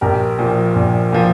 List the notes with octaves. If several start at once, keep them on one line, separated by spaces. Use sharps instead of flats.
A#1 G4 A#4
A#2 F3
A#1
A#2 F3